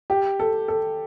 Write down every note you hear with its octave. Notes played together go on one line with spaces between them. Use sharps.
G4
A4
A4